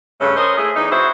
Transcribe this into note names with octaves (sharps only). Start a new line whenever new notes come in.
G2 C#3 A3 C#4
G#4 A#4 C5 C#5 D#5
A3 E4 G#4
E2 D#4
E4 F#4 G#4 C5 E5